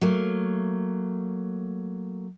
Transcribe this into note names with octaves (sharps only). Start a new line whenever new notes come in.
F#3 A3 A#3